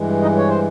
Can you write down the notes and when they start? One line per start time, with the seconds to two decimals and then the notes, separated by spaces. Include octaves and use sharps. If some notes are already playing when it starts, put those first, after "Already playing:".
Already playing: G2 E3 G#3
0.22 D#4 D#5
0.37 C#5
0.48 C5